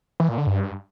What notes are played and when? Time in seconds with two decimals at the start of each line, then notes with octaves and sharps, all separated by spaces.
0.20 E3
0.29 A#2
0.38 D3
0.47 G2